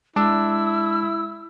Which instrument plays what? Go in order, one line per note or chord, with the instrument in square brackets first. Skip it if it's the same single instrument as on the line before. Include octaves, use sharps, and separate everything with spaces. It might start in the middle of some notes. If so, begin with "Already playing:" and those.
[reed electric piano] G#3 [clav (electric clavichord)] D4 [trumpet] E4 [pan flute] E6